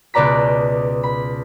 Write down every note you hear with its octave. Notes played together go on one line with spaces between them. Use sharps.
C#2 B2 B4 D5 A#5 B6
B5